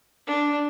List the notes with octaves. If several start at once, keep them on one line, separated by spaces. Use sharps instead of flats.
D4